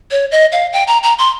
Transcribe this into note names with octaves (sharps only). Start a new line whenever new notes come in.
C#5
D#5
F5
G5
A#5
A#5
C6